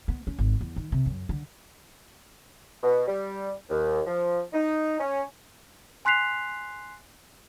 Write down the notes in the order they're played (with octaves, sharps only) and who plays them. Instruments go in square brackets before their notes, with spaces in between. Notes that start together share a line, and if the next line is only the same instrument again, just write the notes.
[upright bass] B3
C#4
G#1
E2
D#3
C3
F#2
D3
[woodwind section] B2
G3
D#2
F3
D#4
C#4
[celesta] G#5 C6 F#6 B6 C7 F7